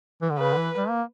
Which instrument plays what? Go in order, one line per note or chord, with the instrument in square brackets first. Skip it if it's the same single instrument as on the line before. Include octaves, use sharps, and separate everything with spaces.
[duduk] E3
D3
[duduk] C#3 [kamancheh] B4
[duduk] D3
E3
G3
A#3